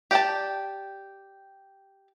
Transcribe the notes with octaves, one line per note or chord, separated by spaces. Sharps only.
G4 D5 F#5 G5 A5